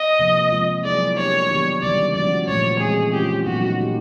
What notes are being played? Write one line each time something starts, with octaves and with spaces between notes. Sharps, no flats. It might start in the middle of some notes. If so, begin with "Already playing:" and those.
Already playing: D#5
C3 F3 A#3
F3 G#3 C4 F4
F#3 B3 E4 G#4 D5
A#3 D4 G4 C#5
D#3 F#3 B3 D4 G4
C#3 E3 G3 D5
F3 G#3 C#4 F#4 D5
A#2 F3 A3 C#5
E3 G#3 C4 G#4
E3 A3 C#4 F4 G4
A#2 F#3 B3 D#4 F#4
A#3 D#4 G4